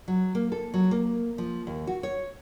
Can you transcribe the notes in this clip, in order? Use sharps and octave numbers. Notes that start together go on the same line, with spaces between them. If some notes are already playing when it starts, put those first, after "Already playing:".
F#3
A#3
A4
F#3
A#3
F3
D#2
F#4
C#5